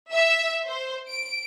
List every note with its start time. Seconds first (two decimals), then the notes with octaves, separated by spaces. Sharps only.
0.12 E5
0.65 C5
1.08 D7